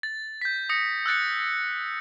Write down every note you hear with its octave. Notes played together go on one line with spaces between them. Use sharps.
A6
G6 B6
D#6 A#6 C#7
E6 F#6 A6 C#7